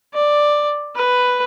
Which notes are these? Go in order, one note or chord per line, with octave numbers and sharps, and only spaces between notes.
D5
B4